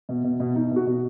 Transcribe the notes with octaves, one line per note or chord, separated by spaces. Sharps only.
B2
B2
B2
B2 D#4
B2 F#4
B2